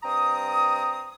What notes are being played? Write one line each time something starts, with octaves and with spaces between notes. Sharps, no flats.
G2 C4 A#5 D#6